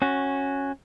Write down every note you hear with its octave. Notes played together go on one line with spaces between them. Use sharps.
C#4 F#4